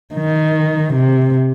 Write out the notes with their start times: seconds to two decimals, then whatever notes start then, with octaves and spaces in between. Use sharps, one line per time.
0.14 D#3
0.94 C3